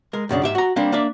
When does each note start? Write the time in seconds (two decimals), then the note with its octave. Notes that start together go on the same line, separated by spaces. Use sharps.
0.13 G#3 A#4
0.29 B1 F#2 C#3 D4
0.42 G#2 G4 E5
0.55 F#4 A#5
0.76 G3 A#3 C4 D4
0.92 A#3 D4 D5 E5